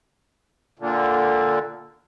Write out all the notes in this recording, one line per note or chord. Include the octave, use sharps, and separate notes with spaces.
A#2 D3